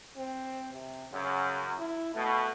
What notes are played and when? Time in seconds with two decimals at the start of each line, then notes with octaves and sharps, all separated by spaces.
0.17 C4
0.73 C3
1.13 F#2 C#3
1.79 E4
2.15 B2 A3